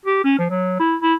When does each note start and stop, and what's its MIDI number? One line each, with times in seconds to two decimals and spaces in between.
0.05 0.20 67
0.24 0.38 61
0.38 0.47 53
0.50 0.77 54
0.79 0.96 64
1.02 1.14 64